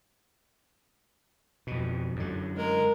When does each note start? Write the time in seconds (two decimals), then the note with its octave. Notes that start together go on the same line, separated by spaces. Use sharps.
1.67 F2 B2
2.16 F#2 D3
2.57 G#3 A#4